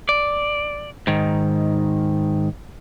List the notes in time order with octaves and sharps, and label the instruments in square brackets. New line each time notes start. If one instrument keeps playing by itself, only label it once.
[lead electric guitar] D5
G#2 D#3